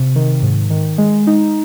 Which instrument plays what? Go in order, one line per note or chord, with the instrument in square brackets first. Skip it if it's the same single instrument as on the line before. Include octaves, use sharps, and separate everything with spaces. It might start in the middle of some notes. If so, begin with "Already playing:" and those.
Already playing: [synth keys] C3
D#3
G#2
D#3
G#3
D#4